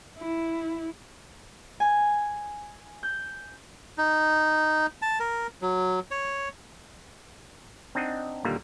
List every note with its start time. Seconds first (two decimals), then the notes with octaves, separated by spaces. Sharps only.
0.18 E4
1.80 G#5
3.03 G6
3.98 D#4
5.02 A5
5.20 A#4
5.62 F#3
6.11 C#5
7.95 C4 D4 D#4 D#5 F#5
8.44 D#2 A#2 D3 G3 A#3